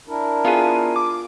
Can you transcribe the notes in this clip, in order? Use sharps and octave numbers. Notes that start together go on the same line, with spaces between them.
D4 E4 A#4
B3 F4 G#4 D#7
D6